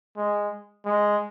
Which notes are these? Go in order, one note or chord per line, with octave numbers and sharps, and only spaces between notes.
G#3
G#3